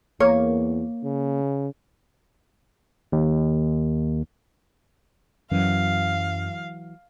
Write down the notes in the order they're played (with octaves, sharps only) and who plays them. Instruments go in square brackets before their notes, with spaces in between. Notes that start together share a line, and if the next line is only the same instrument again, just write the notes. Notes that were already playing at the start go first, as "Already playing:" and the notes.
[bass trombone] E2 [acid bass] A#3 [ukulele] C#5
[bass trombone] C#3
[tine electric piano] D#2
[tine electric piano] F#2 [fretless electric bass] E3 F#3 [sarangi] F5